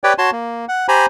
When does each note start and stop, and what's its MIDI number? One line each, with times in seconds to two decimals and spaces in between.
0.04 0.13 67
0.04 0.13 71
0.04 0.13 73
0.04 0.13 74
0.04 0.13 79
0.18 0.31 66
0.18 0.31 73
0.18 0.31 81
0.18 0.31 84
0.32 0.65 58
0.68 0.87 78
0.88 1.06 67
0.88 1.06 72
0.88 1.06 80
0.88 1.06 82
0.88 1.06 83